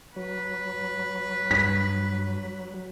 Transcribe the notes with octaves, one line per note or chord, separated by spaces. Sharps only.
F#3 B4
G2 B6